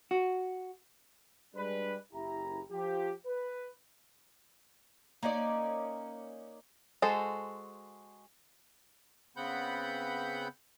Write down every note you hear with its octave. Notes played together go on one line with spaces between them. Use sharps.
F#4
G3 G#3 D4 B4
F#1 E4 G4 A#5
F3 G4
B4
A#3 C#4 D#4 D5
G#3 F#4 A4 C5
C#3 B3 C4 F#5 B5 G6